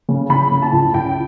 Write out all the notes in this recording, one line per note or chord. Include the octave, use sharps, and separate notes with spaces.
C#3
C#3 B5
C#3
A5
C#2
C#2 G5